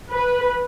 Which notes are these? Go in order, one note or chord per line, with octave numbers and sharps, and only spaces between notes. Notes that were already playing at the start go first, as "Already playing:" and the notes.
B4